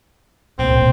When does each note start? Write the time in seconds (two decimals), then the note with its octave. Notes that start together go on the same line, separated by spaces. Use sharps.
0.59 C#2 A#2 C4
0.77 G2 B2